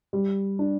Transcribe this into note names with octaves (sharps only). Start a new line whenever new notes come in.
G3
D4